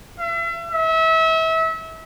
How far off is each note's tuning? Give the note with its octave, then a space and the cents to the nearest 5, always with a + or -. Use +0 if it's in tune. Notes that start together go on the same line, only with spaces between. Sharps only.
E5 +40
E5 -30